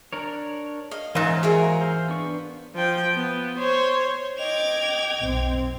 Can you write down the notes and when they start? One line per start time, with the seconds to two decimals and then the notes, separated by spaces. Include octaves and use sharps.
0.13 D4 A#4 C#5
0.91 D#5 F5
1.15 G#2 E3 A#3 C#4 C5 E5
1.43 F4 F#4 G#4 A#4 E5
1.81 C5 F5
2.08 B3 D4 C#6
2.75 F3 G5
3.14 B3
3.58 C5 C#5
4.39 D#5 G5 D6 G#6 F7
5.20 B1 C4